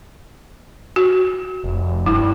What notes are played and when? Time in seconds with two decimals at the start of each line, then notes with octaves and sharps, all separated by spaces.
0.96 F#4
1.64 F1
2.06 G2 E4